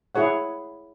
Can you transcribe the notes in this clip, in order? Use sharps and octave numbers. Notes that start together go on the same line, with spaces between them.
E4 G#4 C#5 F#5